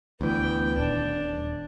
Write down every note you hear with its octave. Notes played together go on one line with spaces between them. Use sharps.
D2 E3 B3 G5
D#1 D4